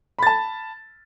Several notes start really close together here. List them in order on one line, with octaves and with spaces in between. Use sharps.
B5 A6 A5